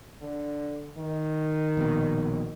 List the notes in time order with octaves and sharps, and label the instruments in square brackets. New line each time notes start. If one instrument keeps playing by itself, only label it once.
[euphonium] D3
D#3
[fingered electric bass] A#1 B2